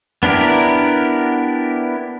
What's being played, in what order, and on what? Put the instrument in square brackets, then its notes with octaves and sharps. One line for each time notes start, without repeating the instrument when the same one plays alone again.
[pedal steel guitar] B3 D4 E4 G4 A#4